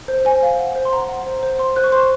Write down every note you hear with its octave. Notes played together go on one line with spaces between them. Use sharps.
C5
C5 G#5
F5
F#5
C5
C6
F#5 A#5
F#5
C5
C5
C5 C6
C5 F#6
C#6
C5 C6